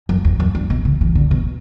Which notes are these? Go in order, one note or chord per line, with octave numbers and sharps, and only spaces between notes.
F#2
E2
F#2
G2
B2
C#3
E3
D3
B2